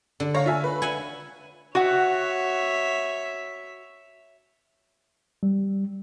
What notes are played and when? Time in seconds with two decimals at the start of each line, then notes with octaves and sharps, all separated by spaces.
0.20 D3
0.34 C#5 F5 A#5
0.46 F4 E5 G#5
0.64 B4
0.82 E5 F#5 G#5
1.75 F#4 C#5 E5 F#5
5.43 G3